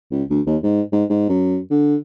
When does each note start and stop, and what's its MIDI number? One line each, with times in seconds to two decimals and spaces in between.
0.11 0.23 37
0.30 0.41 38
0.46 0.57 39
0.63 0.82 44
0.92 1.04 44
1.10 1.28 44
1.29 1.58 42
1.71 1.96 50